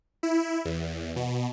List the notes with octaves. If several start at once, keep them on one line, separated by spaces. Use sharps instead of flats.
E4
E2
B2